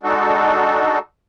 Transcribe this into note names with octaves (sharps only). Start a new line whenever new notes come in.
G#3 D4 D#4 F#4 A4